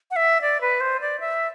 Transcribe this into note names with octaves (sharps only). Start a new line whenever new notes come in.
F#5
E5
D5
B4
C5
D5
E5